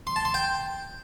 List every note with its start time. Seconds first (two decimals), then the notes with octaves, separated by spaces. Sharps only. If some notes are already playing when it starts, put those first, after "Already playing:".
0.07 C6
0.16 A5
0.25 C6
0.34 G5